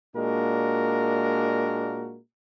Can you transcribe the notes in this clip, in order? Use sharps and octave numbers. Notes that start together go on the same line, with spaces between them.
A#2 G#3 A#3 D4 F#4 A#4